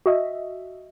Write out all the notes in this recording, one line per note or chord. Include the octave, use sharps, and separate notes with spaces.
F#4 D#5 E5